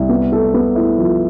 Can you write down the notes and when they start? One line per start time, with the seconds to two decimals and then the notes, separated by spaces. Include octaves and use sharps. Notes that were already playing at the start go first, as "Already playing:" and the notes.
Already playing: C2
0.09 B3
0.32 A4
0.54 B3
0.75 E4
0.98 F3